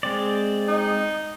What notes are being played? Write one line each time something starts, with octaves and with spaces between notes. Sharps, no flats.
G#3 C4 D5
D#4